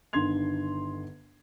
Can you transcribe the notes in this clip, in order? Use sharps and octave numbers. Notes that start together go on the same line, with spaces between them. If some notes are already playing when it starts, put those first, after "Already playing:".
G1 D3 D#3 C6 G#6 F7